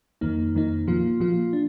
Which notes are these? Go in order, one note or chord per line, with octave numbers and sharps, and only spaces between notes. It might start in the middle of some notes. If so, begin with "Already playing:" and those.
F2 D#3 A#3 D#4
F2 D#3 A#3 D#4
A#2 F3 A#3 F4
A#2 F3 A#3 F4
D4